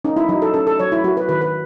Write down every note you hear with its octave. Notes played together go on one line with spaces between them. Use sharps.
C#4 D#4
E4
F#3 D#4
A4
C#4 A4
A4
F#3 C#5
E4
F#3 F#4
B4
D#3 B4
B4